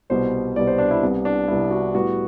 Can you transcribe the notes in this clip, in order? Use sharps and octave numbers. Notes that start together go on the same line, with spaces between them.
C2 B2 G3 B3 C5
C2 B2 G3 B3 D5
C5
D4
E4
C2 C3 G3 B3
D4
C2 C3 G3 B3 E4
F#4
A2 G3 B3 F#4